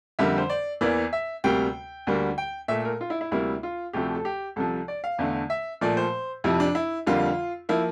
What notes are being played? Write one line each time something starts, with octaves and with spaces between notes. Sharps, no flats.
F2 D3 G3 A#3 E5
C5
D5
E2 E3 A#3 D5
E5
D2 C3 G3 A#3 G5
D2 D3 G3 A#3
G5
A#2 A3 E5
A#4
F4
E4
E4
D2 C3 G3 A#3 E4
F4
D2 C3 F3 A3 G4
A4
G4
C2 C3 F3 A4
D5
F5
E2 D3 A3
E5
A#2 F3 A3 D5
C5
F2 C3 F3 E4
D4
E4
F2 D3 G3 A#3 F4
F3 A#3 E4